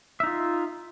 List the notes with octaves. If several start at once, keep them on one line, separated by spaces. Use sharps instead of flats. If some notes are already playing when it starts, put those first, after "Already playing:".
D#4 F4 E5